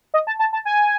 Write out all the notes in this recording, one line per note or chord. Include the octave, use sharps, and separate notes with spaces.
D#5
A5
A5
A5
G#5